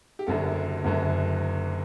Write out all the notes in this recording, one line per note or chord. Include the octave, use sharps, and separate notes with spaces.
G4
F#1 F#2 D3 A4
F#1 F#2 D3